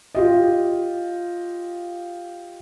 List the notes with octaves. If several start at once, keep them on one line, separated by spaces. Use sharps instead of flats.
F4 G4 D#5